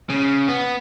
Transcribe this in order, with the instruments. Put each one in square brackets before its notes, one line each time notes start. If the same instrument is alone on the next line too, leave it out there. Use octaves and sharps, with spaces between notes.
[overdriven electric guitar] C#3
B3